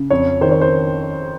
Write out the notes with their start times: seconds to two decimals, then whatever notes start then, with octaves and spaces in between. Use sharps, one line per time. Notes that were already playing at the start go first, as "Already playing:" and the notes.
Already playing: C#3
0.11 F2 C#5
0.41 D#3 C5
0.51 C#5
0.61 C5